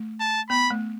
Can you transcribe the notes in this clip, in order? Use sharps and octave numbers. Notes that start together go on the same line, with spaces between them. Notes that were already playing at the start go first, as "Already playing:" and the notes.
Already playing: A3
A5
B3 B5
A3